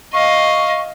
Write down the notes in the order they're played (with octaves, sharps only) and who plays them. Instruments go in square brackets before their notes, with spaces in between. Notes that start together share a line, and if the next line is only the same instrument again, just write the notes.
[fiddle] D#5 F5 [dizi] C#6